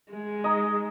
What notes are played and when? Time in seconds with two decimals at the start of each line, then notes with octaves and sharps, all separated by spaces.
0.12 G#3
0.44 D#4 D#5